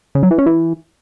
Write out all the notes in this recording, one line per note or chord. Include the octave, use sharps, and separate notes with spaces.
C#3
F#3
E3
C#4
E3